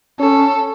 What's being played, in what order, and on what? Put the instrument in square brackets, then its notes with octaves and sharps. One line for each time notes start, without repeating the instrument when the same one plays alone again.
[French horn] C#4 [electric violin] A4